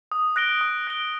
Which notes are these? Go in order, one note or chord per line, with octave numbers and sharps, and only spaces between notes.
D#6
F#6 A#6 D7 G7
D#6
F#6 A#6 D7 G7